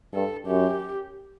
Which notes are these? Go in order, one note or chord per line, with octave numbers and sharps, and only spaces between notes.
G2 A4
F#2 G4